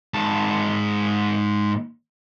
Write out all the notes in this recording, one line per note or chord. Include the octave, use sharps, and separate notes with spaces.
G#2 A5